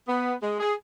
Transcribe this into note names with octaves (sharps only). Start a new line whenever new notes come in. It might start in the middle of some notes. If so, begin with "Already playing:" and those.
B3
G#3
G#4